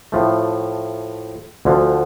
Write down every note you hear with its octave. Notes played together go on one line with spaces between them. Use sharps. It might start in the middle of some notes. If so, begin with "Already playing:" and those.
A2 F3 A3
D2 D3 F3